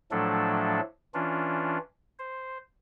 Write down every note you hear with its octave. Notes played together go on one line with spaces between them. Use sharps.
A2 F3 F#3 A3 D4 A4
E3 C#4 D4 F4
C5